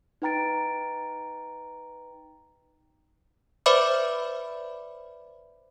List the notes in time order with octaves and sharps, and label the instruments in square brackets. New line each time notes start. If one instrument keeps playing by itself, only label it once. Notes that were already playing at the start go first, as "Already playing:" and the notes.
[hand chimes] D#4 B4 G5 A#5 A6 D7
[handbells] B4 C5 D5 E5 B5 D6